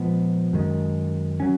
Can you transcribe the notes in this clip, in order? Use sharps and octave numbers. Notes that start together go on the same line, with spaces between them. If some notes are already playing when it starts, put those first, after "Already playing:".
Already playing: A#2 F3 G#3 B3
F#2 D#3 G#3
F#3 C#4